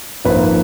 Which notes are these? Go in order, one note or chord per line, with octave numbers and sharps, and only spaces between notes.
G#1 G#2 F3 A#3 B4